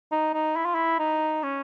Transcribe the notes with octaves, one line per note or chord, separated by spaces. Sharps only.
D#4
D#4
E4
F4
E4
D#4
C#4